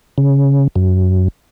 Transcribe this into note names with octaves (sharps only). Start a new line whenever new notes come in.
C#3
F#2